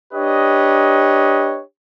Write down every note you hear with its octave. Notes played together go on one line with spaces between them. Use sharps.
D4 G4 B4 C#5 D#5